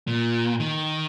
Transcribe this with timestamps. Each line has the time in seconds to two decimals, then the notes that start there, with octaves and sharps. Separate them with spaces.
0.07 A#2
0.60 D#3